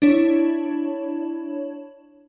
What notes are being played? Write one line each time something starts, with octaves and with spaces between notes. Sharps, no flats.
D4 E4 C#5